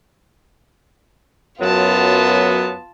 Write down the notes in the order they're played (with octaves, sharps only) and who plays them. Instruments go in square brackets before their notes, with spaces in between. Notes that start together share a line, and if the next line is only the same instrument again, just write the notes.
[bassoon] F#2 [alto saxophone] F#3 [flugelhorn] B3 [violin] F4 A5